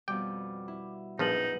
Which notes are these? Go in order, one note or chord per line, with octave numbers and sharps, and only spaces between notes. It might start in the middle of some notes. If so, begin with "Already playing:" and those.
F2 B2 G3 G5 D6
E4
A#1 F#2 F3 B3 D#4 B4 F#7